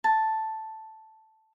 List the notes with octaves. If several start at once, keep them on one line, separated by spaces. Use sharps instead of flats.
A5